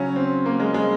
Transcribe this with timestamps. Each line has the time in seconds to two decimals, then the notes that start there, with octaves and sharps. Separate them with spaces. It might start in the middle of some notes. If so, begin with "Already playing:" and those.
Already playing: C#3 F#3 C#4
0.16 C4
0.46 A#3
0.60 G#3
0.74 G#3